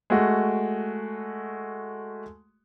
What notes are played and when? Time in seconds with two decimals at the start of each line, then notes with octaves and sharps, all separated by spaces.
0.10 G#3 A3 F#4